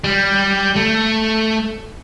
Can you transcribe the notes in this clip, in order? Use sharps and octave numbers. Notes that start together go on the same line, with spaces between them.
G3
A3